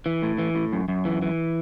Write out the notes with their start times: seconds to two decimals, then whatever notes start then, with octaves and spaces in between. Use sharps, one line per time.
0.06 E3
0.23 A2
0.38 E3
0.55 A2
0.73 F#2
0.88 F#2
1.05 E3
1.22 E3